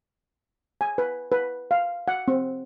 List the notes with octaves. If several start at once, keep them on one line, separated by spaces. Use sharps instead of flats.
G#5
B4
B4
F5
F#5
C4